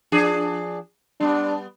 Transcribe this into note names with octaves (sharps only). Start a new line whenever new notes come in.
F3 D4 G#4
G3 B3 D4